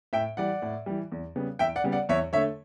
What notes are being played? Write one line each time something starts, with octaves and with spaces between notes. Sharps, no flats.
A2 E5 G5
E3 G3 D5 F#5
A2
E3 G3
E2
C#3 G3 B3
E2 E5 G5
D5 F#5
C#3 G3 B3
D5 F#5
E2 C#5 E5
D3 A3 C#5 E5